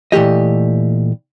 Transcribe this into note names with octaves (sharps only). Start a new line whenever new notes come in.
A#2 E3 A3 G4 D#5